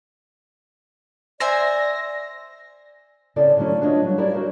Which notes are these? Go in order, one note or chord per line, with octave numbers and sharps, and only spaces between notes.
C5 D5 E5 G#5 A#6
C#3 C4 E4 A4 D5
D3 D#3 F#3 A3 C#4 E4
D4 F4 B4 C#5 D#5
F#3 G3
E4 G4 A#4 C#5 D5
F#4 A#4 C5 E5